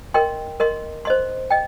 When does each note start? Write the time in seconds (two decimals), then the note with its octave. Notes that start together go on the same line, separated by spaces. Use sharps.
0.14 A#4 D#5 G5 C6
0.60 A#4 D#5 C6
1.05 C5 D#5 C6
1.51 D#5 G5